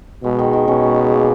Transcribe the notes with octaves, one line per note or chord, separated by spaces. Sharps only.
B2 G#3
D#3
D#3
B2 C#4
G#3
G#3
A#3